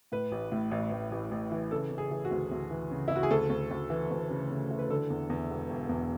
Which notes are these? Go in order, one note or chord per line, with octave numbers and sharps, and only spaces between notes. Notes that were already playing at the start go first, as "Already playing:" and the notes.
A2 B4
A1
A2
A1
A1
A1
A1
E3
C#3 A4
C#3
G#4
E3
F#4
D2
D2
E3
C#3
E4
C#3
F#4
G#4
D2 A4
D2
D2
E3
D2
C#3
C#3
E3
B4
D3 A4
E2
E2
E1
E1
E2